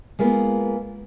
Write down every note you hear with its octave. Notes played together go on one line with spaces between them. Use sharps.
G#3 A#3 B3 F4